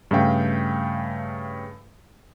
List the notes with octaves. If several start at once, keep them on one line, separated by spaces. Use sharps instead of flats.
G2 C#3 A3 E5 F5 G5